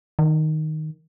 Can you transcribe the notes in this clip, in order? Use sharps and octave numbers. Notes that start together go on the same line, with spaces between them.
D#3